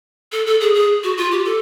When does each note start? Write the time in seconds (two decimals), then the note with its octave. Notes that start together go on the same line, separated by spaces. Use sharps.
0.32 A4
0.47 A4
0.61 G#4
0.75 G#4
1.04 F#4
1.17 F4
1.31 G4
1.45 A4